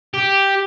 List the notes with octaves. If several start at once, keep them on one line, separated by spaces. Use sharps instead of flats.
G4